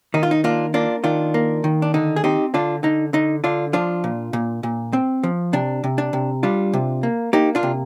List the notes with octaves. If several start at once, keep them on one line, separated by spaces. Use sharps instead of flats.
D#3 D#4
F4
D#4
A#3 D4 F4
A#3 D4 F4
D#3 D4 F4
A#3
D#3
D4
D3 D#4
G#4
C4 D#4 G4
D3 D4 F4
D3 D#4
D3 D#4
D3 D4 F4
F3 D4 F4
A#2
A#2
A#2
C4
F3
C3 D4
C3
D4
C3
G3 D4 F4
C3
A#3
A#3 D#4 G4
D4 F4
C3